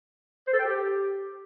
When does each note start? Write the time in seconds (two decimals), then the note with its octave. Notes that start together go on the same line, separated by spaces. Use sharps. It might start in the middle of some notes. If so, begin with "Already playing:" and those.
0.47 C5
0.53 A4
0.59 G5
0.65 G4